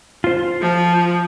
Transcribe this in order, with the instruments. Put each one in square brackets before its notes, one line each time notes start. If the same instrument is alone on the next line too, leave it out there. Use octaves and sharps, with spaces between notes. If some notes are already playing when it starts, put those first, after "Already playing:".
[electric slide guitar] F4 C5
[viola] F3